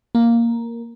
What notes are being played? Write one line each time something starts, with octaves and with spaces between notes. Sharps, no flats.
A#3